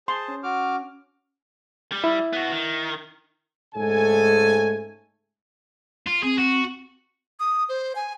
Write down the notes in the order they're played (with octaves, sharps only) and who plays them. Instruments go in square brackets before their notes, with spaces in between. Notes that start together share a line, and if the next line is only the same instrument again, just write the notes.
[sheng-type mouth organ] G#4 C5 A5 [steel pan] C6
[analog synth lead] C#4
[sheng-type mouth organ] F#4 D6 F6
[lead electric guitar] G3
[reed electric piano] E4
[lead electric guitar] B3 F#4
D#3
[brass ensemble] G#2 C#3 A3 A4 G#5
[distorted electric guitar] F4
[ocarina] C4 [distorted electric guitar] G#4
[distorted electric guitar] F#4
[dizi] D#6
C5
G#5